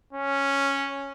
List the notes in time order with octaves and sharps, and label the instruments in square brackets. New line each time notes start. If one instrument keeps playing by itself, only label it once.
[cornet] C#4